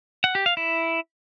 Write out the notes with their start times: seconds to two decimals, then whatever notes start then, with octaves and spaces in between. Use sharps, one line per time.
0.24 F#5
0.35 G4
0.46 F5
0.57 E4